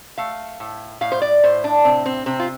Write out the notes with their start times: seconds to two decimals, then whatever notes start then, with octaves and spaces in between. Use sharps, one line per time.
0.18 A3 F5
0.60 A2
1.01 A2 F5
1.12 C5
1.22 D5
1.43 A2 C5
1.64 D4
1.84 C3 C4
2.06 C4
2.26 C3 C4
2.39 F4